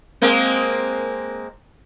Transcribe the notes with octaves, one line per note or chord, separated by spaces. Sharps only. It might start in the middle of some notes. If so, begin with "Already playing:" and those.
G#3 A#3 C4